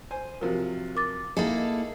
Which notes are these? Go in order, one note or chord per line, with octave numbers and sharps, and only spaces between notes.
C5 G#5
C3 F3 F#3 A#4
A#4 D6 A6
A#3 D#4 E4 G#4 A4 D#5